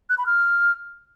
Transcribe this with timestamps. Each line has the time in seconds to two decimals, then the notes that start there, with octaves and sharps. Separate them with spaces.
0.10 F#6
0.18 B5
0.26 F6